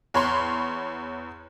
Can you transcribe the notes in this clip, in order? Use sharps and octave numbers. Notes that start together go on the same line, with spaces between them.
E2 C#5 B5 C6